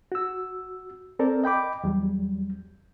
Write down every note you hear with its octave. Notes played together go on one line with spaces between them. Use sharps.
F#4 E6
C4 A4 A#4 D5
D#5 G5 B5 D6
E2 F#3 G3